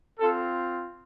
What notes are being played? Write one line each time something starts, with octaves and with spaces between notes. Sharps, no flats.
C4 F4 A4